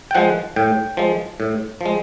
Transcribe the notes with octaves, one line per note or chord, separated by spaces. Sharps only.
G5
F3 G#3 F#5
A2 G5
F3 G#3
A2
F3 G#3